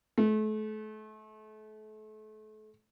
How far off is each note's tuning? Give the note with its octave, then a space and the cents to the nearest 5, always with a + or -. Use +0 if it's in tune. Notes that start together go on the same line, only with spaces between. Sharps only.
A3 -35